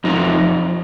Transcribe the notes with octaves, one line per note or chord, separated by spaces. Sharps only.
F2 F3 D#4